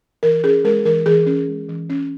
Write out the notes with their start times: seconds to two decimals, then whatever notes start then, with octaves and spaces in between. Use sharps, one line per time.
0.23 E3 A#4
0.44 C#4 G#4
0.64 G#3 A#4
0.85 E3 A#4
1.06 E3 G#4
1.26 C#4
1.48 G#3
1.69 E3
1.90 C#4